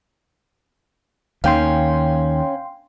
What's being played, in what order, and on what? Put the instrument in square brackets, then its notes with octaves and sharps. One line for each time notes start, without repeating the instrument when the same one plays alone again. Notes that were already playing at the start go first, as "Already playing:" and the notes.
[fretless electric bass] D#2 D#3 [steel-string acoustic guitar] C#4 [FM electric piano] F5 G5 C6